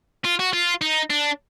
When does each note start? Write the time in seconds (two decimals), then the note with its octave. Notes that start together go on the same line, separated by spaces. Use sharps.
0.25 F4
0.39 F#4
0.53 F4
0.81 D#4
1.10 D4